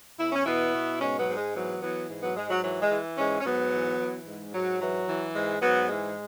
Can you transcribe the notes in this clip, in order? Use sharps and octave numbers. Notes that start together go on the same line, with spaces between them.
E2 E4
C#4
B2 B3 E4
B2
G#2 G#3 C#4
F#3 B3
G#2
G#3
E3 F#3 B3
E3 F#3 B3
G#2
F#3 B3
G#2 G#3
F#3
E3 F#3
G#3
E3
G#2 G#3 C#4
C#4
G#2 F#3 B3
E3
E3
G#2
G#2 F#3
E3 F#3
E3
G#2 G#3
G#2 F#3 B3
E3 G#3